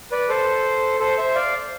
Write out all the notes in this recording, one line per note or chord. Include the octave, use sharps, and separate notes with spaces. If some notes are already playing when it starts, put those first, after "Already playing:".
B4 D5
A4 C5
A4 C5
C5 E5
D5 F5